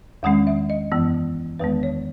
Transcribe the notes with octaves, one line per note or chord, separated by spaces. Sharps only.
E2 D#3 G#3 C#4 F#5
E5
D#5
F#2 E3 B3
E2 D#3 G#3 B3 B4
C#5